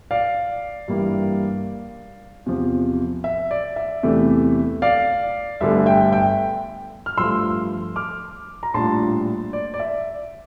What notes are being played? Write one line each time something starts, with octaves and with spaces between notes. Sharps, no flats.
D5 F5
G2 E3 G3 A#3 E4
E2 C3 F3
E5
D5
E5
E2 C3 E3 A3
D5 F5
G1 G2 D3 A3 E5
E5 G5
E5 G5
F6
G2 F3 A3 C6 E6
D6 F6
A#5
A#1 A2 G3 D4 F4 A5 C6
D5
D5
E5